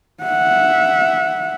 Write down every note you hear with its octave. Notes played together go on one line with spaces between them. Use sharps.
E5 F#5